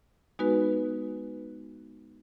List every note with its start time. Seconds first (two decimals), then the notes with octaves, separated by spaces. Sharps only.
0.39 G#3 B3 D#4 F#4 B4